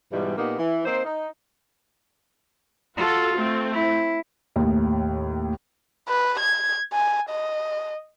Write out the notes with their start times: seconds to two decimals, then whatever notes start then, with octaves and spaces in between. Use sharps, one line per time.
0.12 G#2 B2 E3 G3
0.37 A#2 A#3 B3 D#4 G4
0.58 E3
0.85 A#3 C4 D#4 C5
1.05 D#4
2.97 F4 F#4 A4
3.35 A3 C4
3.73 E4
4.56 D#2 A2
6.08 B4
6.39 G#6
6.93 G#5
7.29 D#5